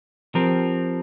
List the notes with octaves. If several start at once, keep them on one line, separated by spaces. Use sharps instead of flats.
F3 C4 G4 A#4